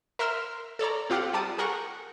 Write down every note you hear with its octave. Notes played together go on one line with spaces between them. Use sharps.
A#4 E5 C6 E6 F6
A4 C#5 D5 A#5
C4 F4 G4 F5 F#5
G3 D5 A5 D#6
G#4 A#4 F#5 G5 C#6